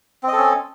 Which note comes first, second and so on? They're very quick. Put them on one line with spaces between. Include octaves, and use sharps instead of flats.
C4 D#5 A4 C#4